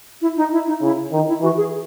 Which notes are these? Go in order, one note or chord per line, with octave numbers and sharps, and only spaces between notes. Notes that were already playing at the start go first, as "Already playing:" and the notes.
E4
D#4
E4
D#4
C#3 E4
D#3 D#4
E4
E3 F#4
G#4